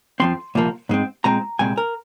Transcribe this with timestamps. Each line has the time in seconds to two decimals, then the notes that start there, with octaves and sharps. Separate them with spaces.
0.20 F2 F3 C4 C6
0.55 C2 A#2 F3 A#3
0.89 G#2 G#3 C4
1.24 A#2 G#3 C4 A#5
1.59 C2 A#2 G#3 C4 G#5
1.78 A#4